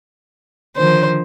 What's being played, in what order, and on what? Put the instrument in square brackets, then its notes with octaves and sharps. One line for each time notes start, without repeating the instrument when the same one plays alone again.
[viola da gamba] D3 D#3 F3 [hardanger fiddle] C5